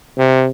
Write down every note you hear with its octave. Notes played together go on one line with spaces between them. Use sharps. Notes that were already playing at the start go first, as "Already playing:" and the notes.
C3